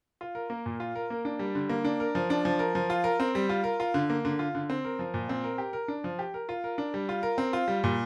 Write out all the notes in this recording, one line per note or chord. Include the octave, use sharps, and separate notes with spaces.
F4
A#4
A#3
A#2
F4
A#4
A#3
D4
G3
D3
A#3
D4
A#4
F3
D4
F3
A#4
F3
F4
A#4
C4
G3
F4
A#4
F4
D3
A#3
D3
F4
D3
C4
A#4
F3
A#2
C4
A#4
G4
A#4
D4
F3
G4
A#4
F4
A#4
D4
G3
F4
A#4
C4
F4
G3
A#2